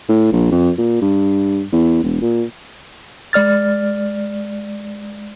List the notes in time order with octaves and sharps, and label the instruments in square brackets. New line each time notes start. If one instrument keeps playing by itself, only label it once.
[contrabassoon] A2
A#1
F2
A#2
G2
E2
E1
A#2
[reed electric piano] G#3 D5 F6 A6